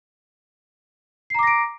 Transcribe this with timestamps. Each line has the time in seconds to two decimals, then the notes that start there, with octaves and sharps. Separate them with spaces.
1.30 C7
1.34 A#5
1.39 D6
1.43 A#6
1.47 D7